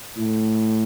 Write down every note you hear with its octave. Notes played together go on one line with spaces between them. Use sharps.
A2